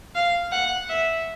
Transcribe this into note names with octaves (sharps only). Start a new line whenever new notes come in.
F5
F#5
E5